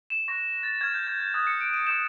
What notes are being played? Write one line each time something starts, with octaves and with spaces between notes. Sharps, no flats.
E7
C#6 F#6 A#6
A6
C#6 F6 G#6
G6
G6
G6
D#6 F#6 G#6
C#7
D7
D#7
D#6 G6 E7